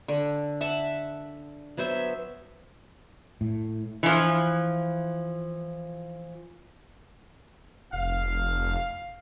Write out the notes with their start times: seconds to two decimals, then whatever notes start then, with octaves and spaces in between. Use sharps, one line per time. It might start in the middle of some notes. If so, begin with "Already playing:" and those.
0.08 D3
0.61 E5 F#5 A5
1.77 F#3 B3 C5 E5
3.41 A2
4.03 E3 F3
7.93 F1 F5